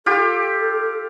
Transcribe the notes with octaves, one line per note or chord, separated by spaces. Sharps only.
F4 G4 A4